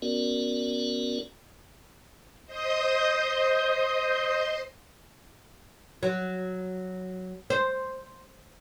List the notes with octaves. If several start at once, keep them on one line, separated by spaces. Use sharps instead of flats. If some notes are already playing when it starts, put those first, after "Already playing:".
B3 C#4 F#4 A#4 D5
C5 D#5 C6 D#6 G6
F#3
C5